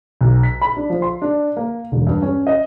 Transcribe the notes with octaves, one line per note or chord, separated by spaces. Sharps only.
B1
B6
B5
D4
F3
C6
D4
A#3
E1
G2
C#4
D#5